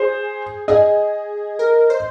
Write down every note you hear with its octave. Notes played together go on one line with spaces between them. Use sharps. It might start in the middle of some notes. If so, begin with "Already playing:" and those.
Already playing: G#4 C5
G#4 D#5
A#4
C5